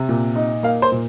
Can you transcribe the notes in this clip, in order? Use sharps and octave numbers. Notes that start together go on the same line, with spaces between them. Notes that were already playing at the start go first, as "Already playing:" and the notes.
Already playing: C3
A#2
D#4
A#3 F5
C5
A#2